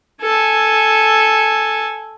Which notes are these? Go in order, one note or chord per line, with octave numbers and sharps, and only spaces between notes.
A4 G#5